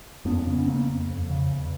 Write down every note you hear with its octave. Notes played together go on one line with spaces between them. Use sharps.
F2 B3 C#4
C#3 B3 C#4
C#4
C#3 A#3 C4
F2
F2
C#3
E2